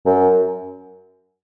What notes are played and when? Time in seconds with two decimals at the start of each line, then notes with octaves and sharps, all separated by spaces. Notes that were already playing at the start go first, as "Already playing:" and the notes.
0.06 F#2